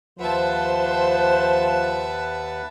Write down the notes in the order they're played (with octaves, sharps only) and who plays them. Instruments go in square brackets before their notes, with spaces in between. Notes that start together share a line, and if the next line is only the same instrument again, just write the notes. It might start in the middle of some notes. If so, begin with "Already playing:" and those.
[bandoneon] D#2 B4 F#5 [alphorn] F3 [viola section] C5 [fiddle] E5 A5